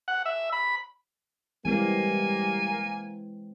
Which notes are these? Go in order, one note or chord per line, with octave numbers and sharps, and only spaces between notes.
F#5
E5
B5
E3 G3 G#3 A#3 C4 G#5